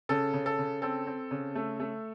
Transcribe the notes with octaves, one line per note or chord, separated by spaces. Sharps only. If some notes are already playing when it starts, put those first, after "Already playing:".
C#3 A4
C#3
A4
C#3
C4 A4
C4
C#3
A3
A3